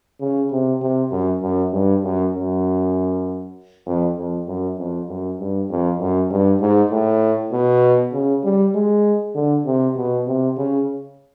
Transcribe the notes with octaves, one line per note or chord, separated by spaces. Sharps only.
C#3
C3
C3
F#2
F#2
G2
F#2
F#2
F2
F2
F#2
F2
F#2
G2
F2
F#2
G2
G#2
A2
B2
C#3
G3
G#3
D3
C3
B2
C3
C#3